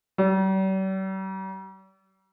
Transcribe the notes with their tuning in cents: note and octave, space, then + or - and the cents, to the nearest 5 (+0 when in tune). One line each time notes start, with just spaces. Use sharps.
G3 -45